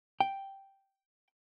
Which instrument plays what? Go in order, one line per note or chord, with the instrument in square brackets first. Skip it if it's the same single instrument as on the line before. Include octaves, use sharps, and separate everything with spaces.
[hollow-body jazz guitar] G5